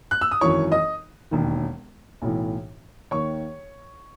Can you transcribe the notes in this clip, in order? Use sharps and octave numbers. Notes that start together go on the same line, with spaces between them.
F#6
E6
D#6
G#1 F#2 E3 C#5 C#6
D#5 D#6
E1 D#2 D#3
B1 A2 E3
D#2 D#3 C#5 C#6